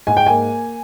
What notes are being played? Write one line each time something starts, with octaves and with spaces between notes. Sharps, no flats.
G#2 G#5
G5
A#3 G#5